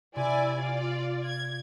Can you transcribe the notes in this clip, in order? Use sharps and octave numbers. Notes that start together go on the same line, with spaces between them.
C3 E4 D5 G#5
F4 D5
G#6